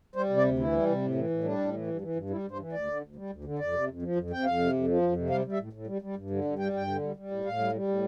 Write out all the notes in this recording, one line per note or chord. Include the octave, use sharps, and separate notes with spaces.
G3 C5
C3
D5
D2
E3 E4
G3
C3
A2
E3
A2
G3 D4
A2
E3
G2
E3
G2
G3 E4
G2
C5
E3
D2 D5
D3
D2
G3
D2
D3
F2 D5
C3
F2
F3
F2
C3 G5
F2 F5
C3
F2
F3
F2
C3
G3 F5
G3
E5
A2
A2
G3
G3
G2
D3
G2
G3 G5
G2 G5
D3
G3
G3
A2
A2 F5
G3
G3
A2